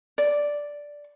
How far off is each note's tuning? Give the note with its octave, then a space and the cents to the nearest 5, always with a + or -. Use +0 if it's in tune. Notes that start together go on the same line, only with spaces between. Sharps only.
D5 -5